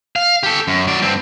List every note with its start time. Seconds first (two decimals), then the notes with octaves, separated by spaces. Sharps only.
0.16 F5
0.43 G4 A4
0.68 F#2
0.87 F#3 D5
1.02 G2 C4